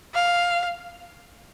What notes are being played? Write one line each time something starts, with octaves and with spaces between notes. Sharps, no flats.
F5